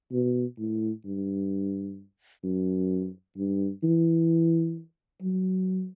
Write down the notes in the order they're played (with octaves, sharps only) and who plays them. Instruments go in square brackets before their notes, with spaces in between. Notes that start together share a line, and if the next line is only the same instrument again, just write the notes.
[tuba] B2
A2
G2
F#2
G2
E3
F#3